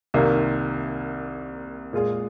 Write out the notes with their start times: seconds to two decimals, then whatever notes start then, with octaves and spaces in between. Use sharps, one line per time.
0.14 C2 C3 D#3 A#3
1.93 A#2 G#3 F4 G#4